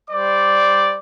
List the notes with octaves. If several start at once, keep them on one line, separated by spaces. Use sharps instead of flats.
G3 C5 D5 D6